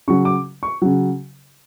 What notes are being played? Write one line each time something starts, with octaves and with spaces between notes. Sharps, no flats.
C#3 F#3 C#6
D6
C#6
C#3 F#3